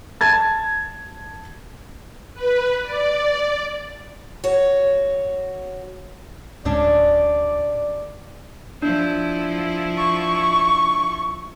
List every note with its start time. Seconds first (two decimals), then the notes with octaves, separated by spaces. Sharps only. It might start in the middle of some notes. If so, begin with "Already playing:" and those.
0.21 A5 G#6 A6
2.34 B4
2.83 D5
4.44 F#4 C#5
6.65 D1 A2 G3 G#3 C#4 D4 D5
8.82 F3 D4 E4
9.97 C#6